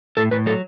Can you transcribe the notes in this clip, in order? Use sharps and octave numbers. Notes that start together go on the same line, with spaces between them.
A2 A4
A2 B4
F#3 A4